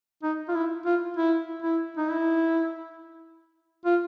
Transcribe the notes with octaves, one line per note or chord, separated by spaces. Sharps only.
D#4
F4
E4
F4
E4
E4
D#4
E4
F4